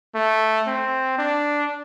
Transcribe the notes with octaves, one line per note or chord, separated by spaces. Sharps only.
A3
C4
D4